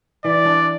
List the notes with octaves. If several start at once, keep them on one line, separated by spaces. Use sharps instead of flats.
E3 D5
D4